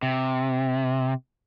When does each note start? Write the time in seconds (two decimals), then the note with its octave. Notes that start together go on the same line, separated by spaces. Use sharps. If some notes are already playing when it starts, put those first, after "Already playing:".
0.02 C3